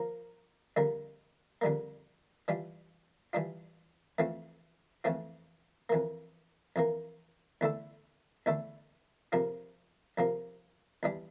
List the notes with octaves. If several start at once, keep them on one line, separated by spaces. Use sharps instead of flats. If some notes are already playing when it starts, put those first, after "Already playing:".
Already playing: F3 A#3 A#4
F2 D3 G3 A#3
F2 D3 G3 A#3
E3 G3 D4 F4
E3 G3 D4 F4
F2 E3 A3 C4 F4
F2 E3 A3 C4 F4
F2 E3 A#3
F2 E3 A#3
E2 D3 A3 E4 A4
E2 D3 A3 E4 A4
F2 C3 F3 A#3 F4
F2 C3 F3 A#3 F4
E2 E3 G3 D4